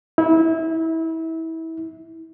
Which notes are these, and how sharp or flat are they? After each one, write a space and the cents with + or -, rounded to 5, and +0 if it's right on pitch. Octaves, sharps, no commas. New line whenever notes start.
E4 -25